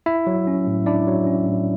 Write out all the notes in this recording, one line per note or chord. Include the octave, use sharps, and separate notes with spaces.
E4 E5
F#3
C#4
A2
D4 E4 D5
F#3
C#4
A2